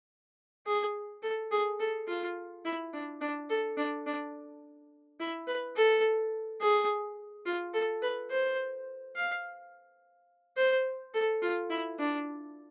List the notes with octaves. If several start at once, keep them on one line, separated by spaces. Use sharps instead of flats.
G#4
A4
G#4
A4
F4
E4
D4
D4
A4
D4
D4
E4
B4
A4
G#4
F4
A4
B4
C5
F5
C5
A4
F4
E4
D4